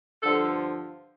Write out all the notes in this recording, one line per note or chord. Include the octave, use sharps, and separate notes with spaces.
G2 D3 F3 A4